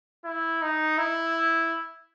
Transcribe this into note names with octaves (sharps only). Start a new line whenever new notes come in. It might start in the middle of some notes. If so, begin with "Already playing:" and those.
E4
D#4
E4